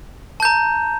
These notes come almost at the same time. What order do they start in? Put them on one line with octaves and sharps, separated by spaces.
A5 G6 A#5